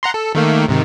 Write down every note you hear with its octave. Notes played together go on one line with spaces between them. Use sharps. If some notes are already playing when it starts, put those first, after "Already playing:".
F#5 A#5 C6
A4
D#3 A3 A#3
G#2 C3 D#3